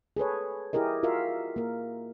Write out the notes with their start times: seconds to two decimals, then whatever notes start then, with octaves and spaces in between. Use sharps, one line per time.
0.17 G#4 A4 B4 C#5
0.73 E4 G4 G#4 A#4 D#5
1.03 F4 F#4 A#4 E5 F5
1.56 A#3 A#4